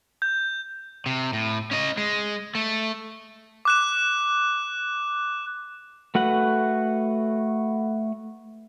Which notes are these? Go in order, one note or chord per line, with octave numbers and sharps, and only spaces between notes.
G6
C3
A2
C#4 D#5
G#3
A3
D6 F#6 E7
A3 F#4 B4 F#5